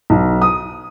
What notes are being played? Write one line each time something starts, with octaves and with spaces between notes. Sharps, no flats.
B1
D#6